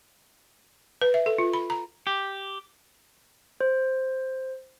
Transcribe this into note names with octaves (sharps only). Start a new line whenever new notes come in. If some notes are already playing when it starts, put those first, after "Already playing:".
B4
E5
A4
F4
B5
A#5
G4
C5